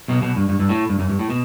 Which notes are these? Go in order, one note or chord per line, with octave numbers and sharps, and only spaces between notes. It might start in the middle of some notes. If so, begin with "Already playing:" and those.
B1 B2
B1 B2
G2
G2
G2
A2
G2
F#2
G2
A2
B2